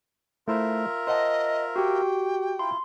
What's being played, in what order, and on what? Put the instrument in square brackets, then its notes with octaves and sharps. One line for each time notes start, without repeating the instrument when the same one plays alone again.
[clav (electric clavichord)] A3 E4 C5 [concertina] F4 A#4 E5
[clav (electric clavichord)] C5 F#5 A5 [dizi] D#5
[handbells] F#4 G4 [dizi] G5
[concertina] E4 F4 [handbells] C6